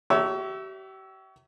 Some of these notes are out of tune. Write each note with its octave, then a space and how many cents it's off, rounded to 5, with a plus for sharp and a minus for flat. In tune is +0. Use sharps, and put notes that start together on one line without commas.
G4 -40 C#5 +30 E5 +0